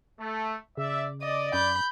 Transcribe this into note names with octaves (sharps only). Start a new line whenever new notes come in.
A3
C#3 D5 E5
D5 D#5
F#2 B5 G6